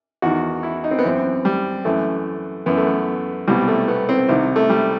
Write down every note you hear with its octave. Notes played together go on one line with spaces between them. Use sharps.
E2 D#3 F#4
E4
D#4
C4
B3
F#2 E3 C4
G3
F#2 E3 A3
F#2 E3 B3
A3
B3
C2 B2 G3
A3
B3
C4
C2 C3 D#3
A3
G3